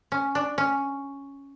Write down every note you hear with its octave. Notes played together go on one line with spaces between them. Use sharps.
C#4
D4
C#4